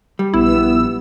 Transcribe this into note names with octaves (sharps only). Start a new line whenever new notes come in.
G3
A#1 B3 E4 E6